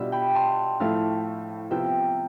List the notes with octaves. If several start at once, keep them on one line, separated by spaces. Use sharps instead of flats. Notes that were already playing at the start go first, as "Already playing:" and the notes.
Already playing: B2 G3 D4 F4 E5
G5 B5
A5 C6
A2 F3 A3 E4 F5 A5
C3 F3 B3 F4 E5 G5